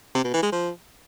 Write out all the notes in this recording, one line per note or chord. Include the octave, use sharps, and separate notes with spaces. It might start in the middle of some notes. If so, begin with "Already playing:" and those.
C3
B2
E3
G#3
F3